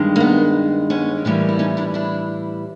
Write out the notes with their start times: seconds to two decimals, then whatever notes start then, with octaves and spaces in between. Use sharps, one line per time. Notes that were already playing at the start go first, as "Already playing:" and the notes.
Already playing: G2 D#3 G#3
0.16 A#3
0.20 B3
0.90 B3 C#4
1.25 A2 E3 G3 A#3
1.49 E4
1.59 C#4 D#4
1.77 D4 E4
1.94 D4 E4